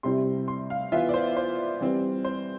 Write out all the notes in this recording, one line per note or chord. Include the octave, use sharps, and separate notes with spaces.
C3 G3 C4 E4 C6
C6
F5
E3 B3 F4 E5
D5
C5
C5
E3 G3 C4
C5